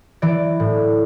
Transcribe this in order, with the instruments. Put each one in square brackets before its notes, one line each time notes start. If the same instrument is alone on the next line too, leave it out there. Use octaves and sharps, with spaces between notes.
[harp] E3 D5
A2